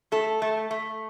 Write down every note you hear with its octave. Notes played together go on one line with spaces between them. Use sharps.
A3 A4
A3
A3